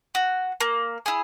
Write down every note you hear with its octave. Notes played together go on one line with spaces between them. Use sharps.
F#4
A#3
E4 G#4